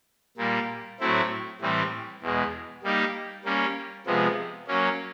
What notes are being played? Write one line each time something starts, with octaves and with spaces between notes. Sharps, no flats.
A#2 G3 A#3
A2 F#3 A3 C4 E4
A2 E3 G3 C4
E2 B2 G#3
G3 A#3 D#4 G4
G3 A#3 C#4
C3 F3 G#3 B3
F#3 A#3 C#4